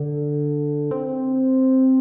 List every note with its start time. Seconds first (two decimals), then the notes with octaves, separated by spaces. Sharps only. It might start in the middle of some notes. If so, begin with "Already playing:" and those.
Already playing: D3
0.91 C4